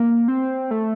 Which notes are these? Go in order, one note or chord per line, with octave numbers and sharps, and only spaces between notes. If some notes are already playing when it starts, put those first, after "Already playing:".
Already playing: A#3
C4
A3